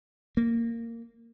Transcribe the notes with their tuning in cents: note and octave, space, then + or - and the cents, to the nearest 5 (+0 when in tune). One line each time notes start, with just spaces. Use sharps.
A#3 -15